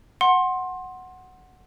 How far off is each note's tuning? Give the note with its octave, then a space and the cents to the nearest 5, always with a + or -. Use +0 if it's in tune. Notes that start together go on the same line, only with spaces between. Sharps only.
F#5 +0 C6 +20